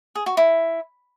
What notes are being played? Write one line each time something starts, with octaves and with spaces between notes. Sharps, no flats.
G#4
F#4
E4